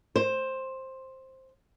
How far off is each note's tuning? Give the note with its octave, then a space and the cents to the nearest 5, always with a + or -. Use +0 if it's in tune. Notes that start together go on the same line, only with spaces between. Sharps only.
C5 +10